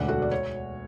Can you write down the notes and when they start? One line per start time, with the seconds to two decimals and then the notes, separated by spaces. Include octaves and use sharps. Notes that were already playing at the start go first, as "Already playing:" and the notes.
Already playing: E1 D2 D3 D5 F#5
0.08 F#4 A4
0.22 D5
0.31 C#5